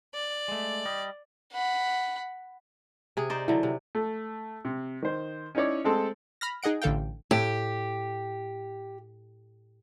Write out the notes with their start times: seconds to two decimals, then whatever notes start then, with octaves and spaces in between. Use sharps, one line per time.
0.14 D5
0.48 G#3 A3
0.85 G3 D#5
1.52 F#5 B5
3.17 C3 G#4
3.30 D#4 C5 D5
3.48 D3 F#3 E4
3.63 C3
3.95 A3
4.65 C3
5.02 D#3 C5
5.55 C#4 D#4 E4 C#5 D5
5.85 G#3 A3 C4 A4
6.41 B5 F6 A#6
6.63 D#4 G#4 D#5 F#5 D7
6.82 A1 D3 A4 F5 G5
7.31 A2 G4